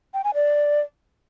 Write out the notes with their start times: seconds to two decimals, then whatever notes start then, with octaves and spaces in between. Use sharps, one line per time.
0.14 G5
0.24 G#5
0.34 D5